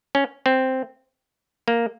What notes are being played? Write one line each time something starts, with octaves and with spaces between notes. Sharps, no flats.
C#4
C4
A#3